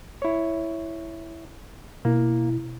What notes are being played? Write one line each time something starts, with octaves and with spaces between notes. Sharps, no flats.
E4 C#5
B2 A#3 E4